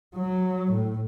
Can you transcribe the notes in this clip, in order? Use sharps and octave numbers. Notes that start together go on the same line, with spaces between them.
F#3
A2